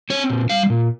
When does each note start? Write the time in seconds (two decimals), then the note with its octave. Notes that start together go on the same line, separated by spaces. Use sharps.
0.10 C4 C#5
0.30 A#2
0.50 G3 F5
0.70 A#2